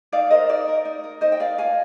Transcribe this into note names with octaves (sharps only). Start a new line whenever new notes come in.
D#4 D5 F5
A#4 C5 D#5
D#4 D5
A#4
D#4
A#4
D#4 C5 D#5
G5
A#4 D5 F5
F4 F5 G#5